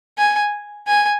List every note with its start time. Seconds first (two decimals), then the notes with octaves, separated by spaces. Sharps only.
0.18 G#5
0.87 G#5